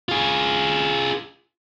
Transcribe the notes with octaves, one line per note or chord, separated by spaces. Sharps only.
F4 G#4